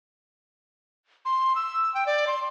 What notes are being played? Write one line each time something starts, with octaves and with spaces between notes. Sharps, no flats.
C6
E6
G5
D5
C6